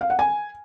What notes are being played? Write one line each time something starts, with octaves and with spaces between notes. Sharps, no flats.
F5
F#5
G#5